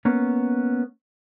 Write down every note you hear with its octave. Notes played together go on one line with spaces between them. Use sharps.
A#3 B3 C#4